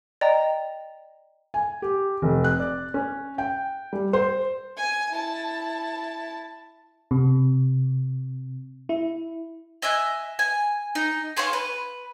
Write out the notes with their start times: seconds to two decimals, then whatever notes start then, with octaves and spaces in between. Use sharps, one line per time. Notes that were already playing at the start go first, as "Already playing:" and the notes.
0.21 D5 D#5 G5 A#5
1.54 G#5
1.82 G4
2.22 F1
2.44 F#6
2.59 D5
2.94 C#4
3.38 G5
3.93 G3
4.13 C5
4.77 G#5
5.11 E4 A5
7.11 C3
8.89 E4
9.82 D#5 E5 G#5 F#6
10.39 G#5
10.95 D#4
11.37 G#4 C5 C#5 F5
11.53 B4